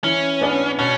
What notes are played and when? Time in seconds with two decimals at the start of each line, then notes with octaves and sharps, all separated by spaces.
0.04 E3 C#4
0.41 B3 D4 G#4 D5
0.79 B2 C#4